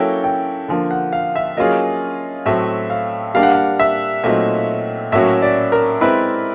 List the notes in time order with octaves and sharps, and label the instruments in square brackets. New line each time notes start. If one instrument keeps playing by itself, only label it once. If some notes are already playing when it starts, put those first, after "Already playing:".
Already playing: [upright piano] F#3 A#3 C#4 E4 A4 [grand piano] G5
[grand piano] G5
[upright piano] D3 F3 A#3
[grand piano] F#5
F5
E5
[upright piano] F#3 A#3 C#4 F4 G#4 [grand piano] D#5
[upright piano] A2 F#3 A3 C4 [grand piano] E5
[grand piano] F5
[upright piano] G3 A#3 D4 G4 [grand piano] F5
[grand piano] F#5
F5
E5
[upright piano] A#2 F#3 A3 C4 D#4 [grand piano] E5
[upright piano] A2 F#3 A#3 C#4 F#4 [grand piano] E5
[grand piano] D5
A#4
[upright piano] G#3 C4 E4 [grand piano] B4